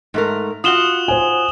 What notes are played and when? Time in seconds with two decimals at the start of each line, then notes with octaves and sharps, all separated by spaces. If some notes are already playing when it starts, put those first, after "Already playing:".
0.14 G#2 A3 A#4
0.64 F4 F#4 F#5 D#6 E7 G7
1.08 C5 G#5